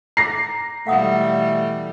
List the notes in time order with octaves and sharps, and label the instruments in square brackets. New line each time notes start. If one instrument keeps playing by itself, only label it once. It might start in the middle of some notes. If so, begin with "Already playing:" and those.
[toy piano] A#5 D6 [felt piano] A#6 C7
[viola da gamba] B2 E3 G3 [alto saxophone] A3 [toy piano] F5 F#5 D#6